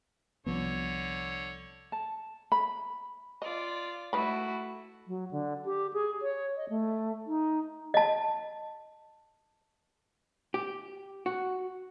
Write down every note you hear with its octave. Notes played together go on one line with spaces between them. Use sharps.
C2 D3 F3 B3 C#5
A5
B5
F4 D5 D#5
A3 D#4 E4 F#4 B4 B5
F#3
D3
G4
G#4
C#5
D#5
A3
D#4
D#5 A5
G4
F#4